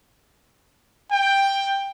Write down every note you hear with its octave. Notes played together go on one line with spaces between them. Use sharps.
G5